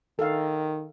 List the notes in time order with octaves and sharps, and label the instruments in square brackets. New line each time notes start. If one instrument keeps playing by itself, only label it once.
[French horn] D#3 [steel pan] A4 F5